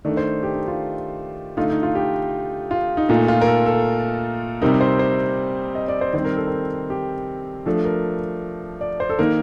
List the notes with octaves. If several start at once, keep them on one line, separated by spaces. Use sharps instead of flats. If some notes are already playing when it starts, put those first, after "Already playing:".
D#3 A3 D4 D5
C5
G4
D#4
F4
D3 A3 D#4 F4
D#4
F4
G4
F4
D#4
A#2 A3 D#4 F4
F4
A#4
A4
A4
C3 G3 C4 D#4 A#4
C5
C5
D#5
D5
C5
D#3 G3 C4 C5
A#4
A4
A#4
G4
F3 A3 D4 A4
A#4
D5
C5
A4
D#3 A#3 D#4 A#4